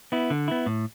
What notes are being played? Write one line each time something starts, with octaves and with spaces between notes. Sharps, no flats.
B3 E4
D3
B3 E4
A2